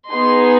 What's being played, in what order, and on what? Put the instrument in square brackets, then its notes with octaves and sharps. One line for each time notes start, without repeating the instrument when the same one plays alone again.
[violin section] B3 D#4 G#4 C6